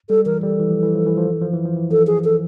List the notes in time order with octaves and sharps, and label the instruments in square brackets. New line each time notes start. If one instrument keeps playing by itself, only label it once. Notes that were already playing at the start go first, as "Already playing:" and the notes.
[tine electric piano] G3 [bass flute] A4
[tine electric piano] E3 [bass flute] A#4
[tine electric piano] G3 [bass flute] A4
[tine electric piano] E3
F3
E3
F3
E3
F3
E3
F3
E3
F3
E3
[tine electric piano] F3 [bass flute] A4
[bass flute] G#4
A4